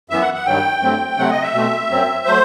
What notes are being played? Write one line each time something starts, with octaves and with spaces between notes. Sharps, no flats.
F#2 E3 B3 E5
F#5
F#5
G2 D#3 F#3 G5
G2 F#3 A3 C4
C3 F#3 A3 C4 F#5
D#5
E5
B2 A3 C4
F#2 F#3 C4
F#3 A3 C5